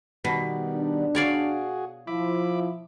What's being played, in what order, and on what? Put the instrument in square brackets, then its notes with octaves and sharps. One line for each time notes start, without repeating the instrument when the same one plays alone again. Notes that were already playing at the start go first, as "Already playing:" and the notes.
[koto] B2 [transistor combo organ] D#3 G3 B3
[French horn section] D4
[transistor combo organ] F#4 G#4 [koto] C#5 D5 F5
[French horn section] F3 E4 [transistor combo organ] E5 B5 D6